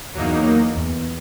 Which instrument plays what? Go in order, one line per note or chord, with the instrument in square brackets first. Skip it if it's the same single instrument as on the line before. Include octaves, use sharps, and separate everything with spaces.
[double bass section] E2 [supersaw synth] F#3 A#3 D#4
[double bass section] E2